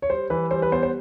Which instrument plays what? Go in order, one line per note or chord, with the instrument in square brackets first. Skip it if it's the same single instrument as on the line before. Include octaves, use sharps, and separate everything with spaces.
[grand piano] C#5
[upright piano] G3 [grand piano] C5
[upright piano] E3 [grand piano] B4
[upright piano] G3 [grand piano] C5
[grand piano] B4
[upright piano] B3 [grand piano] C5
[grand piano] C5